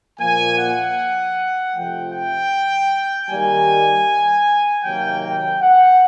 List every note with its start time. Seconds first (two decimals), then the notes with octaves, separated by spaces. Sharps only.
0.19 A#2 F3 A#3 G#5
0.58 F#5
1.74 C3 F3 A3 G5
2.13 G5
3.29 D#3 G3 A#3 G#5
4.84 C3 D#3 F#3 A#3 G5
5.23 G5
5.61 F#5